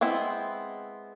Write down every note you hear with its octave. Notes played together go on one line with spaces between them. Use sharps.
G#3 B3 C4 E4